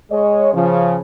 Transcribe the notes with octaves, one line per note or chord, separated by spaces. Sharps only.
G#3 C#5 D#5
C#3 F3